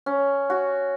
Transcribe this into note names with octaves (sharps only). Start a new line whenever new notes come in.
C#4
F#4